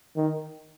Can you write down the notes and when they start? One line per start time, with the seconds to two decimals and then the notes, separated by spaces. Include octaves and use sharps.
0.16 D#3